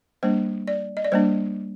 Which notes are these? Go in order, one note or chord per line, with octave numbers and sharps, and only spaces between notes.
G3 A#3 D4 C5
D5
D#5
D5
G3 A#3 D4 C5